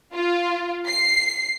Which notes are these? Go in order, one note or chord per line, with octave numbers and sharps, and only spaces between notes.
F4
C7